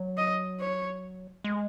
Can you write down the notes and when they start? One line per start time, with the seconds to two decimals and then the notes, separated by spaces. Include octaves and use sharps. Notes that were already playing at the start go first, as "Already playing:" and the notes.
Already playing: F#3
0.17 D#5
0.60 C#5
1.44 G#3